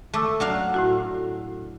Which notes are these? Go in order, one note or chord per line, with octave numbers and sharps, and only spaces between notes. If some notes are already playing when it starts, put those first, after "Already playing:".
A3 A5 D6 E6
F#3 D4 F5
A2 E4 F#4